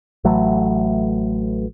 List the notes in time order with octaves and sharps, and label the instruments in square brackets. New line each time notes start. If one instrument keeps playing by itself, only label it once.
[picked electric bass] A1 E3 F#3 A3